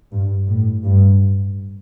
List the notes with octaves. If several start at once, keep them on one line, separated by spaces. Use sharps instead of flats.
G2
A2
G2